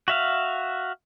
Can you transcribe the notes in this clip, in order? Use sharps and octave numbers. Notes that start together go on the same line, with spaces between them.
F#4 E5 F5